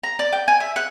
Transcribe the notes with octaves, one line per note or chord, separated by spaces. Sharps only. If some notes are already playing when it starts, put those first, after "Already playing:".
A#5
D5
G5
G#5
E5
F#5